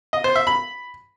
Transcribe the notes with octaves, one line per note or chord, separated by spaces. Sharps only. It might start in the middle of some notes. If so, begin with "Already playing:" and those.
D#5
C5
E5
B5